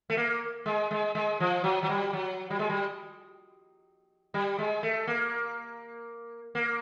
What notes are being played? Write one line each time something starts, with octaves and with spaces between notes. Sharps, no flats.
A3
A#3
G#3
G#3
G#3
F3
F#3
F#3
G3
F#3
G3
G#3
G3
G3
G#3
A3
A#3
A#3